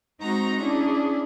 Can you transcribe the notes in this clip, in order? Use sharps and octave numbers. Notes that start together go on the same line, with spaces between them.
G#3 C4 D#4 F#4 A#5 C#6
C#4 D4 E4 G#4